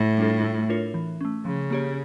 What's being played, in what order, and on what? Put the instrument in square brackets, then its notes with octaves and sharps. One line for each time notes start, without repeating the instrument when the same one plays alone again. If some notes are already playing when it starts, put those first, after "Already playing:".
Already playing: [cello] A2
[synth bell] G3 D4 F4 A4
A3
D4 F4 A#4 C#5
E3
A3 C#4
[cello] C#3 [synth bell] F3
[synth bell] A#3 C#4 G4 C#5